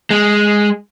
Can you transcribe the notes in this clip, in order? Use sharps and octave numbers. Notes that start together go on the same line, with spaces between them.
G#3